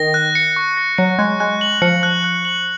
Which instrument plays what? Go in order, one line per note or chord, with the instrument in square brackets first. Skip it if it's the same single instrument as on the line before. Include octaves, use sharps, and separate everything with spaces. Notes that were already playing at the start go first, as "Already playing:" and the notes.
Already playing: [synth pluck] D#3 [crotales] A#6
[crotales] F#6
C#7
C#6
A#6
[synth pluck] F#3 [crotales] C#7
[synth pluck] G#3 [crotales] F#6
[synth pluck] G#3 [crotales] F#6
[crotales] F#7
[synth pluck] F3 [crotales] C#7
[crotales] F#6
F#6
F#7